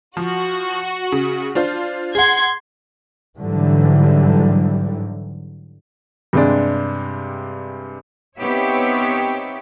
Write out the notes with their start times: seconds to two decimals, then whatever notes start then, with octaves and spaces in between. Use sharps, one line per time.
0.17 F3 F#4
1.12 C#3
1.55 D4 F4 C5
2.15 G#4 F#5 C6 G#6
3.39 G#2 D3 E3 F#3 G3
6.33 G2 C3 G#3 D4
8.38 B3 C4 D#4 G4 C#5 E5